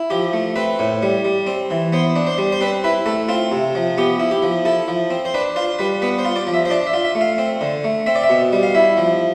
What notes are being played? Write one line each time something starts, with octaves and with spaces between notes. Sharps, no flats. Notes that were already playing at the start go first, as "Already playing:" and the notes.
Already playing: E4
F3 G4
A3
C4 B4
A2
G3
G3
C4
E3
B3 C5
D4
C5
G3
C5
C4 B4
E4 B4
A3 A4
C4 F4
C3
F3
B3 G4
E4
G4
F3
E4 A4
F3
C4
C5
D4 B4
F4 C5
G3 B4
B3 B4
C5
F4
D5
F3
E5
C5
D4 D5
E5
F4
E5
A3
F5
C4
D3
A3
C4 E5
D5
E5
B2
G3
F5
E4 E5
F3